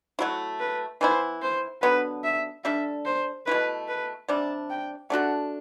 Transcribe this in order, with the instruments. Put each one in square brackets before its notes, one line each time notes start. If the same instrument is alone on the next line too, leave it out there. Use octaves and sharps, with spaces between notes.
[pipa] F#3 A3 E4 [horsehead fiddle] F#4
[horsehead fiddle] B4
[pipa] E3 B3 E4 [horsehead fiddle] C5
[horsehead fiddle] C5
[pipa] D3 F#3 B3 [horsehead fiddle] B4
[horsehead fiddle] E5
[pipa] G3 D4 A4 [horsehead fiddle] E5
[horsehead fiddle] C5
[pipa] B2 A3 E4 [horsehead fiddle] B4
[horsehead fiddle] B4
[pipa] C3 G3 D4 [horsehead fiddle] A5
[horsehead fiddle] G5
[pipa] A3 D4 F#4 A4 [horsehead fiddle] F#5